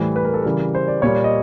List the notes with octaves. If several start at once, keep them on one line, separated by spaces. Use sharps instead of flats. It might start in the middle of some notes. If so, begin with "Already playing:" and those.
Already playing: A2 E3 G3 C5
B4
A#4
A4
C#3 E3 G3 A#4
C5
D5
A#2 G3 C#5
D5
D#5